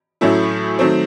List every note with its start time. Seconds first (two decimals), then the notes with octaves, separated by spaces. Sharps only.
0.21 A2 F#3 A3 C#4 E4
0.79 D#3 F#3 A3 C4